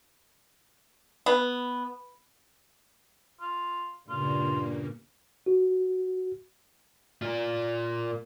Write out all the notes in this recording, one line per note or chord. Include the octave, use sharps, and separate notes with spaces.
B3
F4
G2 A#2 C#3 A#3 F4
F#4
A#3 F4